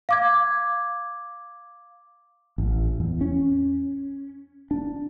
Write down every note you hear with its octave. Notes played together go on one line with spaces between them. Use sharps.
F5 D6 G#6
A1
E2
C#4
D4